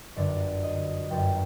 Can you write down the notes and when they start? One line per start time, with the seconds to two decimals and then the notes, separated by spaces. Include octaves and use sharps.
0.16 G1 F#2 D3 D5
0.63 D#5
1.10 G1 F#2 D3 G5